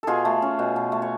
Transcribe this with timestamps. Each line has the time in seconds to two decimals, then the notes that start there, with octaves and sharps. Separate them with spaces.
0.03 B2 F4 G#4 A4
0.25 A3
0.42 C#4
0.59 B2
0.76 B2
0.92 A3
1.02 C#5